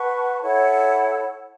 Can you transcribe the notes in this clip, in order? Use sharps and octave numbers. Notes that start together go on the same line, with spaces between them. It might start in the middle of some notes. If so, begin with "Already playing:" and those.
Already playing: B4 F#5 A5 C#6
E4 A4 C#5 F#5